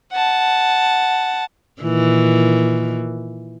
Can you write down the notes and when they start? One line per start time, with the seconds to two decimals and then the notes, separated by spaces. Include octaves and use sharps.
0.12 F#5 A5
1.82 A#2 D#3 E3